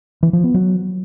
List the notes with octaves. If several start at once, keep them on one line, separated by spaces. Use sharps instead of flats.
E3
F3
B3
F#3